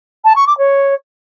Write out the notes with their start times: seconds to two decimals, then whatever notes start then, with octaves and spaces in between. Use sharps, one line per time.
0.24 A5
0.36 C#6
0.47 D6
0.58 C#5